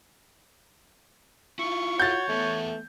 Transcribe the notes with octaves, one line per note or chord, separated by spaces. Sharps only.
E4 F4 C#6
F#4 C#5 G6 A6
E2 A3 B3